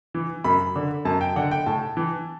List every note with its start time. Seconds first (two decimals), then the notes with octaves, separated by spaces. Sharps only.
0.14 E3
0.44 F#2 B5
0.76 D3
1.05 F#2 A5
1.21 G5
1.36 D3 F#5
1.51 G5
1.66 A2 A5
1.97 E3